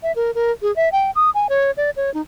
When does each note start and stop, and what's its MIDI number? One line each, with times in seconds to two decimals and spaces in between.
0.03 0.12 76
0.16 0.31 70
0.35 0.52 70
0.62 0.74 68
0.76 0.89 76
0.92 1.11 79
1.15 1.30 87
1.34 1.47 80
1.49 1.71 73
1.77 1.90 74
1.96 2.13 73
2.14 2.22 63